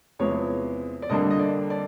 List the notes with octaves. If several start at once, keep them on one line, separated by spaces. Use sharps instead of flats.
E2 C3 F3 G#3 B3 C#5
D5
F2 D3 G3 A#3 D4 D#5
D#5
D5
D5